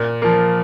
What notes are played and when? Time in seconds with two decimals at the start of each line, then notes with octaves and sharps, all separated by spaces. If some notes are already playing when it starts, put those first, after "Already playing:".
Already playing: A#2
0.22 F3 A#3